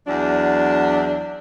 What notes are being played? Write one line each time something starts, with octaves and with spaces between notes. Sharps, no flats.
E2 F#3 D4